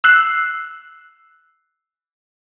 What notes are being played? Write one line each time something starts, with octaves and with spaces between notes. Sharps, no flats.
E6 F#6 C7